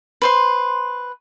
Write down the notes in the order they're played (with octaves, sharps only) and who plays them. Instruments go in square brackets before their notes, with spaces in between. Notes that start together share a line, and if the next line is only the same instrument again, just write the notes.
[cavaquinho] B4 C5 C6